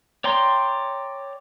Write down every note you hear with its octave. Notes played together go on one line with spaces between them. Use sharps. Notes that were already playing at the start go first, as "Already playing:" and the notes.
C#5 D5 G5 A#5 C6